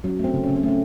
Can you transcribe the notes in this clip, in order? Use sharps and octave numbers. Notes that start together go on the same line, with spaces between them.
F#3 C#4
A3
C4
C#3
C#4
C#3
C4
A3
C#4